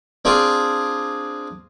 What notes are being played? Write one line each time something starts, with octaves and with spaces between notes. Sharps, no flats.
C4 D4 F4 G#4